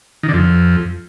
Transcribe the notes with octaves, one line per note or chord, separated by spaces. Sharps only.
D#3
D3
F2